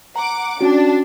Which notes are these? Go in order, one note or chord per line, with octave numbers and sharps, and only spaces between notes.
F#5 A#5 D6
C#4 D4 F#4